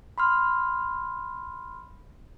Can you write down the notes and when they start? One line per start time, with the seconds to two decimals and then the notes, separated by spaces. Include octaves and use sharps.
0.18 B5 C6 F6